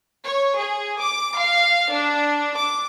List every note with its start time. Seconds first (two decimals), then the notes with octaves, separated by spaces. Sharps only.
0.24 C#5
0.57 G#4
1.00 D6
1.38 F5
1.90 D4
2.56 D6